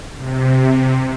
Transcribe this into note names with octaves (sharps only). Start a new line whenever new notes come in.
C3